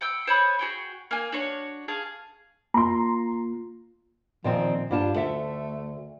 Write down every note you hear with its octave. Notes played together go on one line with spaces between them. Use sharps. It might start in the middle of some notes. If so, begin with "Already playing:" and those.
F#5 G5 E6
C5 C#5 B5 D#6
F#4 G#4 G5
A#3 G#5
D4 F#4 C#5
G#4 F5 A5
A#3 F4 A#5 C6
A#2 D#3 F3 C4
G2 D4 F4 A5
D2 A3 A4 E5